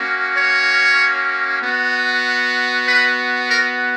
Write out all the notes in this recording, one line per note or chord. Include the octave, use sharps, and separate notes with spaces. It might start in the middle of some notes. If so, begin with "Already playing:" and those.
Already playing: A#3 C#4 F#4
C#5
B3 F#4
B4
A#4